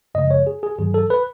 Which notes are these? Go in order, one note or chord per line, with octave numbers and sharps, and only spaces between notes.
F#2 C#3 F3 G#3 D#5
C#5
G#4
G#4
G2 D#3 F#3 G#4
A4
B4